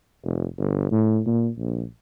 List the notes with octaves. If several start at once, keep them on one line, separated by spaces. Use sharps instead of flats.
F1
G1
A2
A#2
A#1